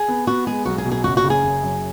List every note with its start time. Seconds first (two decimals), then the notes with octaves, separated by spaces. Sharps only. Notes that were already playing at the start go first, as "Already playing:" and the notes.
Already playing: G#4
0.08 B3
0.27 B3 F#4
0.47 G#3 G#4
0.65 B1 F#4
0.78 G#4
0.85 B2
0.92 G#4
1.04 F#1 F#4
1.17 F#4
1.24 C#3
1.30 G#4
1.43 F#1
1.63 F#2